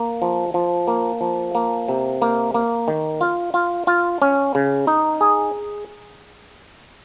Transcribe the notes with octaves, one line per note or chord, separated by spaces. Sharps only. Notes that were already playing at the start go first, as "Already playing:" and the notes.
Already playing: A#3
F3
F3
A#3
F3
A#3
C3
A#3
A#3
D#3
F4
F4
F4
C#4
C#3
D#4
G#4